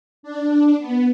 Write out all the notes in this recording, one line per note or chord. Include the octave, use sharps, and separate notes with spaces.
D4
B3